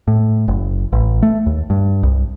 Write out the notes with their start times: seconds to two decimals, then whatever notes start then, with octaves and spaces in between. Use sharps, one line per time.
0.08 A2
0.48 F#1
0.93 A1
1.22 A3
1.46 D#2
1.70 G2
2.03 C2